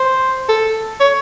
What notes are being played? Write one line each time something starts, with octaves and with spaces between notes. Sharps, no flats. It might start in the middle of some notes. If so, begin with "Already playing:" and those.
Already playing: C5
A4
C#5